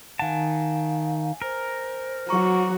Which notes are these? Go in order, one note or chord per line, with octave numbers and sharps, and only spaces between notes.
D#3 F5 F#5 G#5 A5
A#4 C5
F#3 F#4 A#5 C#6 D6